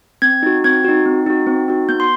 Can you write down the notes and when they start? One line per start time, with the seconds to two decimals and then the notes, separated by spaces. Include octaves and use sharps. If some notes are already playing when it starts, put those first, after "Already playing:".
0.22 C4 G#6
0.43 D#4 F#4
0.64 C4 G#6
0.85 D#4 F#4
1.06 C4
1.26 D#4 F#4
1.47 C4
1.68 D#4 F#4
1.89 B3 G6
2.00 C6